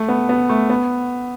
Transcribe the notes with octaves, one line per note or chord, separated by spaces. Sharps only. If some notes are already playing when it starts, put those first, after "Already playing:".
Already playing: A3
B3
B3
A3
B3